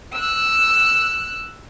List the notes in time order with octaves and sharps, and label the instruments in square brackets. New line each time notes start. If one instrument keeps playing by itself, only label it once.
[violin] E6 F#6